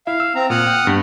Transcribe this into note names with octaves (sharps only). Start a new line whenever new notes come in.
E4 E5 F5
E6
C4 A#5
A#2 A#3 F#5 D#6 F6
G5
G2 B3